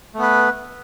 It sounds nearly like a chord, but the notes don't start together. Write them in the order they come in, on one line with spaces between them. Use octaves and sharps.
A3 B3 B4